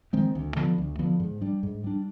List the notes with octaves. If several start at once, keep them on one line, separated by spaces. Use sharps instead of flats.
D#3 G#3 C4
D2
D3 F3 B3
D2
D3 F3 B3
G#2
G3 D4
G#2
G3 D4